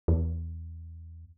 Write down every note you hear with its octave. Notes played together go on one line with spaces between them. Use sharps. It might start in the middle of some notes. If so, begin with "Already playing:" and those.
E2